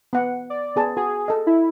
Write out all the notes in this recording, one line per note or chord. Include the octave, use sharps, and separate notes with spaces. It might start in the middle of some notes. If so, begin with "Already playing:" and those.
B3 F#5
D5
B3 G#4 A5
F#4 G#4
A4 D#5
E4